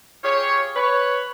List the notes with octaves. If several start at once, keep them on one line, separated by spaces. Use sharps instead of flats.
F4 G4 G#4 C#5
B4 C#5